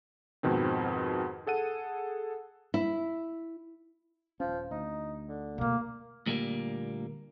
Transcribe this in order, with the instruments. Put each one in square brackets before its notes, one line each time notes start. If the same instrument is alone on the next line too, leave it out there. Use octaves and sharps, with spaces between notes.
[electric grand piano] F2 G#2 B2 D#3 C4
G#4 A4 F#5 D#7
[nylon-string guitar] E4
[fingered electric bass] D#1 C#4 [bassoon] F3
[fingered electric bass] D2 [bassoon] D#4
[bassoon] D3
[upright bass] B2 A3 [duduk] A#3
[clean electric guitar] D2 A#2 G3 G#3 A#3